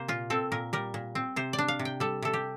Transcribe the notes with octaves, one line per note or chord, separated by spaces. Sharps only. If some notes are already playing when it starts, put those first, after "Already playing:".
Already playing: C3 A#3 C5
A#2 F4
C4 A4
A#2 A#4
G3 A#4
A#2
C4
C3 C5
D5
D4
F5
C3
G5
G3 A4
C3 A4
G4